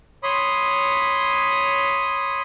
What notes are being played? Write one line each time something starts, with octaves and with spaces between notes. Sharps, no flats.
C#5 B5 C6 D#6